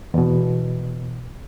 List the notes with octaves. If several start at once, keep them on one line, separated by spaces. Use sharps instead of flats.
E2 B2